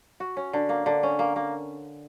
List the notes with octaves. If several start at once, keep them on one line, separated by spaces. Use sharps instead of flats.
F#4
C#4
D3
A#3
D3
C#4
A#3
A#3